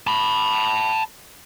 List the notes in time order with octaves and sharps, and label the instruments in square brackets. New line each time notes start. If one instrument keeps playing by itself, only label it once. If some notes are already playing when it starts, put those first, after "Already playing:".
[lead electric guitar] A5 B5